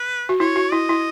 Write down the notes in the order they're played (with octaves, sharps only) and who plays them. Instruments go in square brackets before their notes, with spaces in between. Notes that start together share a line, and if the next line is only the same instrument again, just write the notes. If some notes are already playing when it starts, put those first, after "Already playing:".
Already playing: [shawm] B4
[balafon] F#4
[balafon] E4 [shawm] C#5
[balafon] F#4
[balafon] E4 [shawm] D#5
[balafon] E4